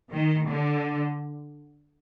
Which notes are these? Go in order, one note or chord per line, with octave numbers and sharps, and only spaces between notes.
D#3
D3